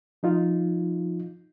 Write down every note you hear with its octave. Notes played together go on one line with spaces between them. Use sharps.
F3 D#4 F4